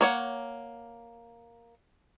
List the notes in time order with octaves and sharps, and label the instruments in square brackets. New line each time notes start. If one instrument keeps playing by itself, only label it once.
[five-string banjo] A#3 C#5 F#5